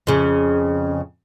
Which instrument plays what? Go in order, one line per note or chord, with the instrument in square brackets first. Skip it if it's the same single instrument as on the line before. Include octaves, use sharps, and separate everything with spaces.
[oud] F2 C#3